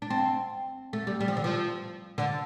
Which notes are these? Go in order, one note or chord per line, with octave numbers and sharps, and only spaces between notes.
D4
C4
A3
G3
G3
F3
D3
F3
D3